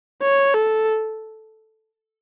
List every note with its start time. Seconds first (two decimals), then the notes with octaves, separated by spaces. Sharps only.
0.22 C#5
0.54 A4